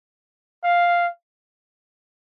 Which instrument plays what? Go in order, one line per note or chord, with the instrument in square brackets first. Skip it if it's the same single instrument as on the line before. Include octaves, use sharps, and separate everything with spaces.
[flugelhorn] F5